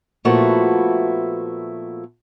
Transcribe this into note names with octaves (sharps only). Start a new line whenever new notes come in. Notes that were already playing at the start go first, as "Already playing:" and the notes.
A#2 F3 A3 B3 E4 F#4